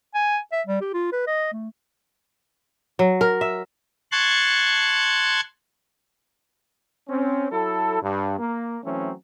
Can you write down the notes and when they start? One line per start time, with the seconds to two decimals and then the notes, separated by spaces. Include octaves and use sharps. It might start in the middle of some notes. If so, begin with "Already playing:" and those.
0.15 G#5
0.52 E5
0.67 G3
0.81 G4
0.94 F4
1.12 B4
1.27 D#5
1.52 A3
2.99 F#3
3.21 A#4
3.41 E5
4.12 A5 C6 C#6 F#6 G#6
7.09 C4 C#4
7.52 F#3 E4 A4
8.02 G2
8.39 A#3
8.84 E3 F#3 A3 C4 C#4